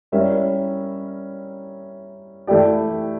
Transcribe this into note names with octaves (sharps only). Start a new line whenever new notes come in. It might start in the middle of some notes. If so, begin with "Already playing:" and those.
G3 C#4 E4 A#4 E5
E3 A3 E4 G4 D5